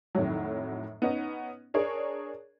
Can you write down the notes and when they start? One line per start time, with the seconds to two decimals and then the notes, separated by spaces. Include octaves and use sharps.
0.15 F2 A2 D#3 F#3
1.02 B3 C#4 D#4
1.74 D4 G#4 A#4 C#5